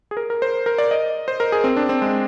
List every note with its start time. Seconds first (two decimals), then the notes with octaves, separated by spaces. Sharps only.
0.11 G#4
0.17 A#4
0.30 A#4
0.42 C5
0.66 A#4
0.78 D5
0.91 D#5
1.28 C5
1.40 A#4
1.52 G#4
1.64 C4
1.77 D4
1.89 C4
2.02 G#3